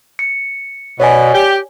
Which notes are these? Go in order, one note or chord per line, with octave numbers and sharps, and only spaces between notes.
C#7
B2 C#5 D5 G#5
G4